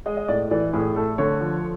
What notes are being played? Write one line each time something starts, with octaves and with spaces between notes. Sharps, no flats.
G#3 D#5
D#5
A2 D5
E3 D5
A2 G#4
A3 A4
D3 C#5
F3